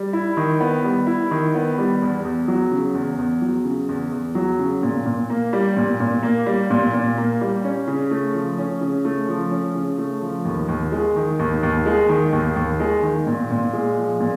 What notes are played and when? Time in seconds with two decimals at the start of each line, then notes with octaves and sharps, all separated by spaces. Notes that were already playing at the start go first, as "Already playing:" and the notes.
Already playing: G3
0.13 E4
0.37 D#3
0.60 B3
0.84 G3
1.07 E4
1.31 D#3
1.55 B3
1.78 G3
2.02 E2
2.24 E2
2.48 F#3
2.71 C#3
2.94 E2
3.18 E2
3.42 F#3
3.65 C#3
3.89 E2
4.12 E2
4.35 F#3
4.59 C#3
4.83 A#2
5.06 A#2
5.30 A#3
5.53 G3
5.77 A#2
6.00 A#2
6.23 A#3
6.46 G3
6.70 A#2
6.94 A#2
7.18 A#3
7.41 G3
7.64 C#4
7.87 C#3
8.11 A3
8.34 F3
8.58 C#4
8.81 C#3
9.05 A3
9.28 F3
9.51 C#4
9.75 C#3
9.98 A3
10.21 F3
10.45 D#2
10.68 D#2
10.92 G#3
11.16 D#3
11.39 D#2
11.63 D#2
11.86 G#3
12.09 D#3
12.33 D#2
12.56 D#2
12.80 G#3
13.03 D#3
13.27 A#2
13.50 A#2
13.73 G#3
13.98 F3
14.20 A#2